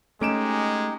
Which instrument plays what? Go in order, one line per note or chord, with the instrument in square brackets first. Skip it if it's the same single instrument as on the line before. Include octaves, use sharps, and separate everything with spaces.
[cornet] G#3 [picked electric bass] A3 [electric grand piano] C#4 D7 E7 [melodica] D#4 G4